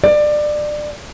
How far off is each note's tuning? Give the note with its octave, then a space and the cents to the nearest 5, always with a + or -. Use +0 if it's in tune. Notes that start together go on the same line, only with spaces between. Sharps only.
D5 +25